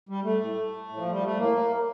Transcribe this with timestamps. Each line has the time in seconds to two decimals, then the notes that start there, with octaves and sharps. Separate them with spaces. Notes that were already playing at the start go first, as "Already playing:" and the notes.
0.09 G3
0.24 A3
0.41 A2
0.89 A2
0.97 F3
1.10 G3
1.24 A3
1.38 A2 A#3